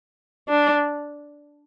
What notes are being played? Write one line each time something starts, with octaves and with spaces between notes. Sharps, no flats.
D4